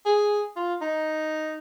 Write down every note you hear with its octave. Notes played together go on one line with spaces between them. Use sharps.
G#4
F4
D#4